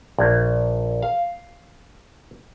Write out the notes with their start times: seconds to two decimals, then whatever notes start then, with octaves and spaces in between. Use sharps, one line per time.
0.18 A#1
1.02 F5